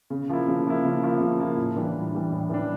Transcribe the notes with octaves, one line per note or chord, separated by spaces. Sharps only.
C#3
F3 A#3 E4
C#3
F3 A#3 E4
C#3
F3 A#3 E4
C#3
F3 A#3 E4
A2
E3 G3 D4
A2
E3 G3 D4
A2
E3 G3 D4